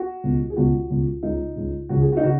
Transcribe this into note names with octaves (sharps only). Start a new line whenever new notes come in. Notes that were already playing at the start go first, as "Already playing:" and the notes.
Already playing: F#4
C#2 B2
G#4
C#2 B2 F#4
C#2 B2
C#2 C#3 D#4
C#2 C#3
C#2 C#3 F#4
G#4
F#4
D#4
C#3 F#4